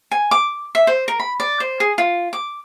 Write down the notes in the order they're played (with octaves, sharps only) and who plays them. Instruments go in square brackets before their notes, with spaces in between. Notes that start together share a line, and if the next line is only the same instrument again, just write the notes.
[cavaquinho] G#5
D6
E5
C5
A#4
B5
D5
C5
G#4
F4
D6